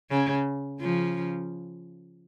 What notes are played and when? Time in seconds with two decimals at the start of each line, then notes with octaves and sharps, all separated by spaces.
0.10 C#3
0.80 C#3 F3